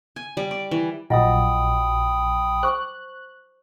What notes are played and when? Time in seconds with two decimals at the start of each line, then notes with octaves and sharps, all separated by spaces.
0.16 G#5
0.37 G3
0.51 D5
0.71 E3
1.10 A#1 F#3 F4 D#5 F#5 G5 B5 D#6
2.63 C5 C#6 D6 F#6